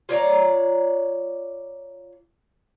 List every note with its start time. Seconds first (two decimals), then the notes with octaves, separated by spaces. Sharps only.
0.09 F4 C#5 D5 A#5